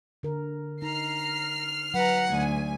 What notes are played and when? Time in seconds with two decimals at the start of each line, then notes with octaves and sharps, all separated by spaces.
0.23 D3 A#4
0.82 D#4 A#5 F6 C7
1.94 F#3 B4 F#5 A#5
2.29 D2 G#5